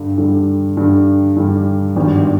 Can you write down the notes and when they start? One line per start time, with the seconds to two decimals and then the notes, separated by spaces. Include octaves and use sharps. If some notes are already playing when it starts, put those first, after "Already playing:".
Already playing: G2 D3 G3
0.18 G2 D3 G3
0.77 G2 D3 G3
1.36 G2 D3 G3
1.96 G#1 G2 D#3 G3 B3